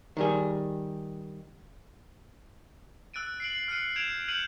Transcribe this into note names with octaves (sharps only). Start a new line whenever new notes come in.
D#3 G3 G#4
E6 F#6 A6 D7 D#7
C7 D7 F#7
F#7
F6 F#6 C7 C#7 D#7
G6 G#6 D7 E7 F7
F6 G6 C7 C#7 D#7 F#7